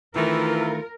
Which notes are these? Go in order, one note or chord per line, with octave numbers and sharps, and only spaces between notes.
D#3 E3 A3 C4 E4 F4 A#4